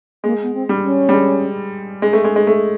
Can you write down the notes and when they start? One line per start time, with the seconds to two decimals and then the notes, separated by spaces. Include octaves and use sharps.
0.24 G#3 A#3
0.42 B3
0.54 C4
0.69 G3
0.79 C4
0.83 C#4
1.09 G3
1.13 G#3
2.02 G#3
2.13 A3
2.24 G#3
2.36 G#3
2.47 A3